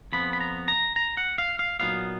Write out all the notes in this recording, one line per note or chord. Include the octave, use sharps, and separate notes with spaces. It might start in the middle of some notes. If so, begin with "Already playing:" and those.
F2 F3 B3 B5
B5
A#5
A#5
A#5
F#5
F5
F5
A#2 F#3 B3 D#4 F5